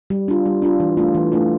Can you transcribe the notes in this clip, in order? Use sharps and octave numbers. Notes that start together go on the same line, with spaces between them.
G3
D4 F4
G3
D4 F4
E3
A3 D4 F4
E3
A3 D4 F4